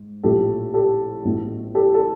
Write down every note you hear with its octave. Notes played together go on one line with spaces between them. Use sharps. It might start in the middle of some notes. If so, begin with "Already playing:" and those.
Already playing: G#2
A#1 A2 F3 G4 A4
G4 A4
A1 A2 F#3 B3
G4 A4
A4